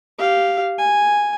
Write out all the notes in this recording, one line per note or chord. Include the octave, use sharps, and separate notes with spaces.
G4 F5
G#5